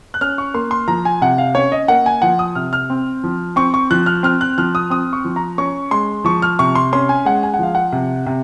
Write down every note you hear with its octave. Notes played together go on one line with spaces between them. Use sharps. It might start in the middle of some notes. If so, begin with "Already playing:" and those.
F#6
C#4 F6
C#6
A#3 C6
C6
F3 A#5
G#5
C3 F#5
F5
C#4 C#5
D#5
A#3 F#5
G#5
F3 F#5
D#6
C3 F6
F6
C4
F3
C4 C#6
C#6
F3 F#6
F6
C4 F6
F#6
F3 F6
D#6
C4 D#6
C#6
F3
A#5
C#4 C#6
G#3 C6
F3 C#6
F6
C3 C#6
C6
C#4 C6
G#5
G#3 F#5
G#5
F#5
F3 F5
F#5
C3
C3